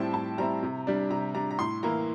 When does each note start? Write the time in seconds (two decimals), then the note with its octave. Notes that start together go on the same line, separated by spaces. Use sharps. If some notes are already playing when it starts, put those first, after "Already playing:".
Already playing: A2 G3 C4 E4 G5 A5
0.14 A2 A5
0.38 G3 C4 E4 A#5
0.62 C3
0.87 G3 D4
1.10 C3 A#5
1.35 G3 D4 A#5
1.51 A#5
1.59 A2 C6
1.83 E3 A#3 E4 A#5